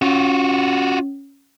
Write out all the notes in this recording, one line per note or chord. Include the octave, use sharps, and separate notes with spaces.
C#4 F4 F#4